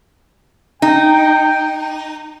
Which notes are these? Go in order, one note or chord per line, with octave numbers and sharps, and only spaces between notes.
D#4 G5